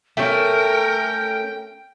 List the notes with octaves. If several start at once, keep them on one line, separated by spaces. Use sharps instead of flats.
A3 C#4 A#4 G5